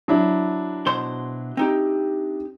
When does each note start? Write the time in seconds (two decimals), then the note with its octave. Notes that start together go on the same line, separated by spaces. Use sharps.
0.08 F#3 D4 E4
0.86 B2 C5 C6
1.57 C4 D#4 G4